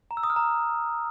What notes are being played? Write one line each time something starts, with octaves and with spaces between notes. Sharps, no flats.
A#5
E6
D#6
F6
A#5